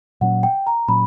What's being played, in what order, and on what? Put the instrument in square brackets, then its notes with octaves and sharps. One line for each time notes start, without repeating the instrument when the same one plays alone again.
[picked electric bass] A#2 F#3 C#4 [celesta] F#5
[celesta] G5
A#5
[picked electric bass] A#2 F#3 C#4 [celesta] B5